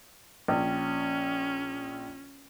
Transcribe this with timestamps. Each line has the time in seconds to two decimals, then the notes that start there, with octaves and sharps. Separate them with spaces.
0.48 A#1 C#4